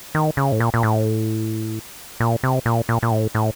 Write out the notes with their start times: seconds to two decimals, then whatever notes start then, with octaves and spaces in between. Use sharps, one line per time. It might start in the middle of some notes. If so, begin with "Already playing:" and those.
0.15 D#3
0.37 C#3
0.52 A2
0.60 A#2
0.74 A#2
0.83 A2
2.20 A#2
2.43 C3
2.66 A#2
2.89 A#2
3.03 A#2
3.11 A2
3.35 A2